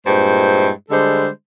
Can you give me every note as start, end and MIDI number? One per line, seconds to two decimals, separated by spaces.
0.06 0.69 43
0.06 0.69 46
0.06 0.69 56
0.06 0.69 64
0.06 0.69 72
0.90 1.28 50
0.90 1.28 55
0.90 1.28 56
0.90 1.28 62
0.90 1.28 69
0.90 1.28 72